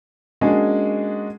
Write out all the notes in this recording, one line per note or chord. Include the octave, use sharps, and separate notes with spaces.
G#3 A#3 C#4 D4 F#4 G#4